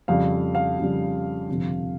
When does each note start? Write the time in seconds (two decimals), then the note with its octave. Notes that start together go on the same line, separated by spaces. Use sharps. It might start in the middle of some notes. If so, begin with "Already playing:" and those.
0.08 F2 C#3 G3 F5
0.55 F5
0.79 F2 C#3 G3
1.48 G1 F2 C3